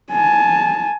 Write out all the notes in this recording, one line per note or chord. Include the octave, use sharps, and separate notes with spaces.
G#5 A5